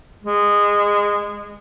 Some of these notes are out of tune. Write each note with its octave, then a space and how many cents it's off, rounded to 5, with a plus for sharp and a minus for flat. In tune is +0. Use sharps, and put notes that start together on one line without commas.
G#3 -20